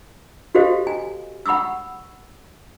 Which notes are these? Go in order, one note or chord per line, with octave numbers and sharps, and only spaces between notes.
F#4 G4 A4 C5 D#5 F5
G#5
F#5 B5 C#6 D#6 E6